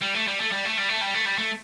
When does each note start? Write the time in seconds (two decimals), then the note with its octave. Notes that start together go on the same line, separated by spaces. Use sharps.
0.02 G3
0.15 A3
0.27 G3
0.40 A3
0.52 G3
0.65 A3
0.77 G3
0.89 A3
1.01 G3
1.14 A3
1.26 G3
1.38 A3